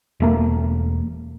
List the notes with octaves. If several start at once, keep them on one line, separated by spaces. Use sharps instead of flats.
E1 A3 A#3